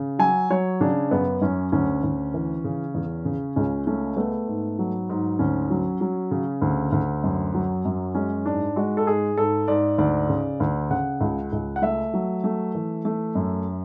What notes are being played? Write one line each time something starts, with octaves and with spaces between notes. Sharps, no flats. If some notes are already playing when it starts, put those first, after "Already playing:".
Already playing: C#3
F#3 G#5
F#3 C#5
C#3 D4
F#2 B3
F#2 C#4
D2 C#4
D2
E3
C#3
E2
C#3
C#2 C#4
A3 C#4
A3 B3
G#2
F#3
G#2
D2 C#4
F#3
F#3
C#3
D2
D2
F#2
F#3
F#2
G#3 C#4
G#2 D4
G#3 F#4
A4
G#2 G#4
G#2 A4
G#2 D5
D2 D5
C#3
D2
C#3 F#5
C#2
C#2
F#5
A3 E5
F#3
A3
E3
A3
F#2